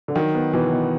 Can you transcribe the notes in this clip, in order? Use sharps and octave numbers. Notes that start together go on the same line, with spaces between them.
D3
D#3 F#3
B3
B2 E3
B2